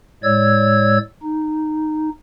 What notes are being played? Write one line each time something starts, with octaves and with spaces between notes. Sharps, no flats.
A2 G#3 C#5 D5 E6 G#6
D#4